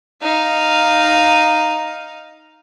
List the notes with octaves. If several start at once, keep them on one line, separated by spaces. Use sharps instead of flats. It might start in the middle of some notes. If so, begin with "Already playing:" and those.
D#4 F5